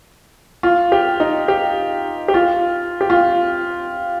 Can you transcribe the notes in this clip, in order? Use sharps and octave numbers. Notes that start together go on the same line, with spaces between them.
F4
G4
D#4
G4
G4
F4
G4
F4